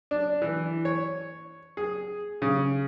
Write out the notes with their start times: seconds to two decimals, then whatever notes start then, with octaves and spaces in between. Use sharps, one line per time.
0.11 D4
0.42 E3
0.85 C#5
1.77 G#4
2.42 C#3